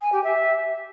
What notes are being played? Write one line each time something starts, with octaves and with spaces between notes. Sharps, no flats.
G#5
G4
E5